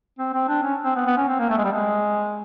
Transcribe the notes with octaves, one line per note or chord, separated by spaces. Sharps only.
C4
C4
D4
C#4
C4
B3
B3
C#4
C4
A#3
A3
G#3
G3
G#3